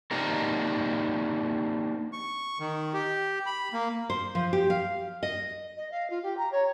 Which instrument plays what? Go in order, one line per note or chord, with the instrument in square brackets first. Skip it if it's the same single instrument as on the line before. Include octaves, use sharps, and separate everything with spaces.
[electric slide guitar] A#3 C4 D4 D#4 G4 A#4
[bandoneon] C#6
D#3
G4
B5
A#3
[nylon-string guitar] C5
F3
G4
F5
D#5
[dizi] D#5
F5
F4
G4
A#5
C#5